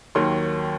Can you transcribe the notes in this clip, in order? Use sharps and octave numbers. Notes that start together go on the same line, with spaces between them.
D#2 D#3 F#3 A#3 C6